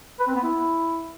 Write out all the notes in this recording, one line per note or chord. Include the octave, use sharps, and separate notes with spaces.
B4
C4
B3
E4